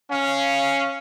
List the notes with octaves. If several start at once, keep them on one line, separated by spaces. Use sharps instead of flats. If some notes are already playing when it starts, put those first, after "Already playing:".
C#4 F5